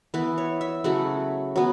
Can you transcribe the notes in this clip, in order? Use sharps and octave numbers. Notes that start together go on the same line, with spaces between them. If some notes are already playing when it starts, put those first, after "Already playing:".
E3 B3 E4 B4
C#5
E5
C#3 F#3 A3 E4 F#5
F#3 B3